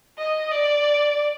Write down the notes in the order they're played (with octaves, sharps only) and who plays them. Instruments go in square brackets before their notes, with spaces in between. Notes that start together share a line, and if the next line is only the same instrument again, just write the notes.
[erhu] D#5
D5